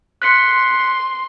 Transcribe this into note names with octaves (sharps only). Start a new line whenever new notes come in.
C6 F#6 B6 C#7